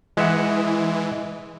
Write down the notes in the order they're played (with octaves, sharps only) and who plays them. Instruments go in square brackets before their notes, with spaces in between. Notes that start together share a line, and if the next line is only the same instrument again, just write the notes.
[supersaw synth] E3 [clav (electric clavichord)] G#3 E5 F#5